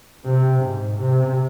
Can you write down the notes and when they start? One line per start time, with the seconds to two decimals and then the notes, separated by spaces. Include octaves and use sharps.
0.24 C3
0.61 G#2
0.98 C3